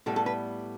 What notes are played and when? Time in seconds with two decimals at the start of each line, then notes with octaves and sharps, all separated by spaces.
0.06 A2 G3 B3 A4
0.16 A4
0.26 B4